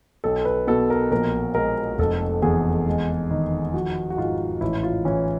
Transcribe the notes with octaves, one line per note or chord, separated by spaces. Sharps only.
B1 A4
B4
B2 A4
A#4
A#1 A#4
G#3 A#4
F1 A4
E2 G#4
G#3
D#3
F3 F#4
F#4
G#2 F4
A1 E4
F4
E3 C#4